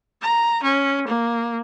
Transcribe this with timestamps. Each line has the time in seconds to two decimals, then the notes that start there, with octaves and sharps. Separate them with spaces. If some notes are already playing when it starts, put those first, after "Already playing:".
0.22 A#5
0.63 C#4
1.07 A#3